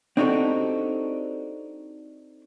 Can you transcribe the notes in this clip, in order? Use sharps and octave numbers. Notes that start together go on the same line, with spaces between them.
C4 D4 D#4 F#4 G4 A4